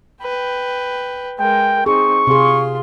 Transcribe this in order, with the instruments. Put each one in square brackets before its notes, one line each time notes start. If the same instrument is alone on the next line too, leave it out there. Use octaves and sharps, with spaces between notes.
[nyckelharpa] B4 G5
[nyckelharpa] G#3 A#4 [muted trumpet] G5
[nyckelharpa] C4 D#4 [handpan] G#4 [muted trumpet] C#6
[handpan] C3 G#4 [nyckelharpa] F4 C6